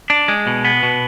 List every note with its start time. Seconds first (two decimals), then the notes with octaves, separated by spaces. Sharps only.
0.10 D4
0.28 G#3
0.47 B2
0.65 B3
0.83 B2